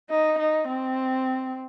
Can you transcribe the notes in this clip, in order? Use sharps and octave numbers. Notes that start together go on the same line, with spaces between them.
D#4
D#4
C4